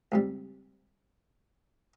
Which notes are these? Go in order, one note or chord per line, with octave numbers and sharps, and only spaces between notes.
C#2 C3 G3